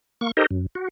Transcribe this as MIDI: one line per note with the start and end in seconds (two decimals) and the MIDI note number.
0.21 0.31 58
0.21 0.31 85
0.37 0.46 63
0.37 0.46 67
0.37 0.46 69
0.37 0.46 70
0.37 0.46 72
0.37 0.46 75
0.51 0.66 42
0.75 0.88 66